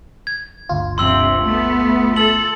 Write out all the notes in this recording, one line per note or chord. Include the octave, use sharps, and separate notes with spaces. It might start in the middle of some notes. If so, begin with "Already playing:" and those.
G#6
G1 D2 F4
G2 C3 C6 E6 F#7
A3 B3
A4 E6 F#7